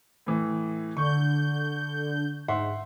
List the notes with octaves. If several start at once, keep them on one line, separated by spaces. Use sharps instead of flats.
A2 E3
D3 C#6 G6
G#2 E5 F#5 C6